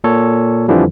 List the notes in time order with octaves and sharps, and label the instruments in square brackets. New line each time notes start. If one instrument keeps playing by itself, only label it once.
[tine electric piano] A#2 A4 C#5
F2 D3 E3 F3 G3